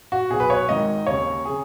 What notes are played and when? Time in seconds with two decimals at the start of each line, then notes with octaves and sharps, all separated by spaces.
0.12 F#4
0.30 B1 B2 G#4
0.40 B4
0.50 C#5
0.69 G#1 G#2 D#3 D#5
1.07 D#2 C#3 C#5
1.45 C#3 G#4